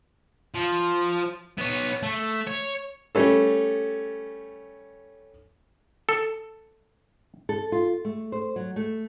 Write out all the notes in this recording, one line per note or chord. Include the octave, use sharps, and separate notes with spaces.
F3
B3 C#5
A3
C#5
G3 A3 C#4 A4
A4
A4
F4
A3
C5
F#3
A3